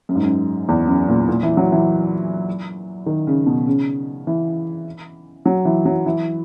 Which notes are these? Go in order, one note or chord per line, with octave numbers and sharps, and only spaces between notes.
F#2
G#2
F#2
E2
F#2
A#2
A#2
E3
F#3
E3
D#3
C#3
B2
C#3
E3
F#3
E3
F#3
E3